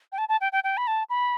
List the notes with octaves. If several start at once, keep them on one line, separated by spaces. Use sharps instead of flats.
G5
A5
A5
G5
G5
G5
B5
A5
B5